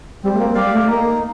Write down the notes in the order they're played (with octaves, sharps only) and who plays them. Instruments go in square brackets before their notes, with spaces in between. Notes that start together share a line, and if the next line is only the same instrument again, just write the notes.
[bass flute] G3 [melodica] C4
[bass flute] A3
A#3
[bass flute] G3 [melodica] G4 D5 F5
[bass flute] A3
[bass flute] A#3 [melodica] D#4